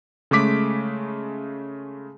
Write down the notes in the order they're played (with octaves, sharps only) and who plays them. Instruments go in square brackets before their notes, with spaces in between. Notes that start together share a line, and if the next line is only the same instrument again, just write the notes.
[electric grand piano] C#3 G#3 A3 D6 B6